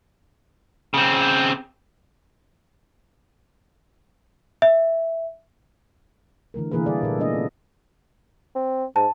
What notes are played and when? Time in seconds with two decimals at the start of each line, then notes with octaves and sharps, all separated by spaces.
0.94 C#3 C4
4.62 E5
6.54 D3 E3 A3 A#4
6.71 C3 E3 A#3 G#4 A#4 B4
6.86 D3 G3 E4 G#4 A4 D5
7.03 A#2 A4
7.18 G#3 A#3 B3 D4 D#5
7.35 C#4
8.55 C4
8.96 G#2 A5